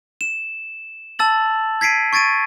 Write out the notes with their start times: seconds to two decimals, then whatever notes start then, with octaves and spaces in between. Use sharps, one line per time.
0.21 E7
1.19 A5 E6 A6 F#7
1.81 G#6 B6 C7 D7 D#7
2.13 C#6 G#6 A6 D7 D#7